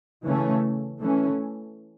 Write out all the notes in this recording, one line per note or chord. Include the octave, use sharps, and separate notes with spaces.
C#3 E3 A3 C#4
E3 A3 C#4